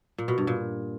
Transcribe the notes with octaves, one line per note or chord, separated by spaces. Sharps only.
A#2
B2
G2
A#2